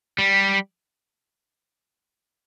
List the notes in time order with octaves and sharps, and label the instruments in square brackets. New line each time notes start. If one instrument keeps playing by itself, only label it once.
[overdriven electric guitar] G3